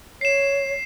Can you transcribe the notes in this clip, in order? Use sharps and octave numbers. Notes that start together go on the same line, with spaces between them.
C#5 C7 E7